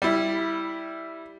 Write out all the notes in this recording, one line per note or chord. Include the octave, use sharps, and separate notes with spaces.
G3 E4